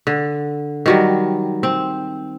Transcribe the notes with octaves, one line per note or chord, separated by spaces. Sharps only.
D3
D#3 F#3 G3
C4